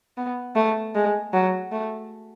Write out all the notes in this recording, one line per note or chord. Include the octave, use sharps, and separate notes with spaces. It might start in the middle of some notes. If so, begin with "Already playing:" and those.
B3
A3
G#3
F#3
A3